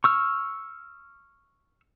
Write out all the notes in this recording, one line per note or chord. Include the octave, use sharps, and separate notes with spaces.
C#6 E6 F6